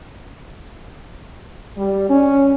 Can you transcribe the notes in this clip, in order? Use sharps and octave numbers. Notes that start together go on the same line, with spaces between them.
G3
C#4